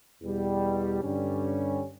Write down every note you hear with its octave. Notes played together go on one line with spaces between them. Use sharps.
E2 B2 G3
G2 D3 G3 C#4